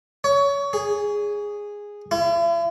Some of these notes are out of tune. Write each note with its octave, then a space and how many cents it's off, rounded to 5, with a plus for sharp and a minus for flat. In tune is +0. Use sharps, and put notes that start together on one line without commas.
C#5 +25
G#4 -10
E4 +45